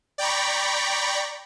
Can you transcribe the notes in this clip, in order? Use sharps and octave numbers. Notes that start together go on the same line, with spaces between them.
D5 G5 A#5 B5 C#6